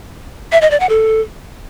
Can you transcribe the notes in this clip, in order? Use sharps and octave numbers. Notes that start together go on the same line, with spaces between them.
E5
D#5
D5
F#5
A4